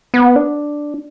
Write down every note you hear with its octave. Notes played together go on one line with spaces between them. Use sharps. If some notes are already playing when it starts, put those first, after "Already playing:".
B3
D4